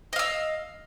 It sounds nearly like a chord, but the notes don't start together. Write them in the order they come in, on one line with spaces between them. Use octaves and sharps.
D#5 F5 E6